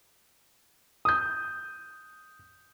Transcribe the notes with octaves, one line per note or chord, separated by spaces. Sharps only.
D#6 G6